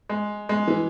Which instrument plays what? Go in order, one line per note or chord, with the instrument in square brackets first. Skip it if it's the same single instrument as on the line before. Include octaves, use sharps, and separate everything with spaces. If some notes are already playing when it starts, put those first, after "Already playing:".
[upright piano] G#3
G#3
E3